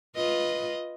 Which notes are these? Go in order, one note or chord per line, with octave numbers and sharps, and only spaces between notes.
F4 B4 D#5